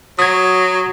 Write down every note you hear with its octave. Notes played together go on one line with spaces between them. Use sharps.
F#3 D#6 G#6